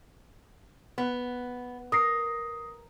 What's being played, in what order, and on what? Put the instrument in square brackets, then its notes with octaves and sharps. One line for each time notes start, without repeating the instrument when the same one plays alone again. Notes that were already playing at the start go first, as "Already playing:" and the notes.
[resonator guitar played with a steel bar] B3
[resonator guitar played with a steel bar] A#4 [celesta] D#6 A#6 C7